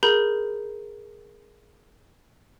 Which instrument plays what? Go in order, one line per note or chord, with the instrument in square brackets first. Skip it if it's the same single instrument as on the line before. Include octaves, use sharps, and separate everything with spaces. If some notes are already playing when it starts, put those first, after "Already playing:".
[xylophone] G#4 A#4 A#5 B5 G6